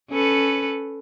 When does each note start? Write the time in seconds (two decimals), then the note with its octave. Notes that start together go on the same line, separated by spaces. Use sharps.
0.10 C#4 A4 B4